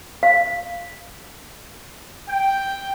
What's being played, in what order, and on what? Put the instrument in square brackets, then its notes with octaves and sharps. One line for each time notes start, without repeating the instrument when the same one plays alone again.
[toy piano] F5
[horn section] G5